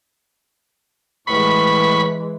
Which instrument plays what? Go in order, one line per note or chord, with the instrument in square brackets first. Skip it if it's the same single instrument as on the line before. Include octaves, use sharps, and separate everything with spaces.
[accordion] A2 C#6 [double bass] E3 G#3 [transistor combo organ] B5